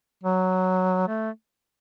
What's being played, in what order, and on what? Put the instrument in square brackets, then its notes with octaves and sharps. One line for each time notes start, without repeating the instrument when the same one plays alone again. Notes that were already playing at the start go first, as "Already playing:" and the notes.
[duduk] F#3
A3